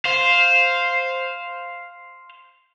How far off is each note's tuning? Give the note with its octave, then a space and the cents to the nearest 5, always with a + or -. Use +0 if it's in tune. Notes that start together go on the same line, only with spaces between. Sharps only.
C5 +0 F5 +0